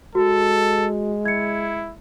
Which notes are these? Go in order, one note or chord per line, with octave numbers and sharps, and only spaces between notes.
G#3 F#4 A4
E4 G#6 C#7